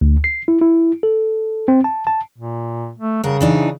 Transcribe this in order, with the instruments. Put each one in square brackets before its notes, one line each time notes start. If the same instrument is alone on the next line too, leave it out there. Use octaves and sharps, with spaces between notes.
[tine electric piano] D2
C7
E4
E4
A4
C4
A5
A5
[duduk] A#2
A3
[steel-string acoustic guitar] G2 A#4 F#5 [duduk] C#3
[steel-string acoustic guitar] E3 D4 D#4